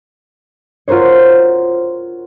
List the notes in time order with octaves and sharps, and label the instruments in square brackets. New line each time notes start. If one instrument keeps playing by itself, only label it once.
[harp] F4 F#4 A#4 C5 C#5